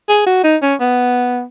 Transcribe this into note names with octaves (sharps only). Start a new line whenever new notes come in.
G#4
F#4
D#4
C#4
B3